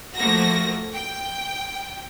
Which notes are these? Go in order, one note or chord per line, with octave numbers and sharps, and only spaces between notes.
F3 A3 A#3 F#4 A#6
G5